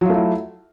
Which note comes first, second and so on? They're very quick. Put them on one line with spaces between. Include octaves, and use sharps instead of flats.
F#3 F4 A3 E4